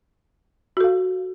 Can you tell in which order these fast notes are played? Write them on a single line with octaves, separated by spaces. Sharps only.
F#4 A4 F5